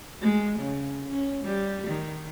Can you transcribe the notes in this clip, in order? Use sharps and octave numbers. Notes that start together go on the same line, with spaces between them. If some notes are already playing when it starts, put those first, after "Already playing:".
G#3
C#3
C#4
G3
D#3